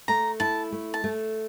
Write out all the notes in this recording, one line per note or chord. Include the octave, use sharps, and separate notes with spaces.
A3 A#5
E4 A5
A3
A5
A3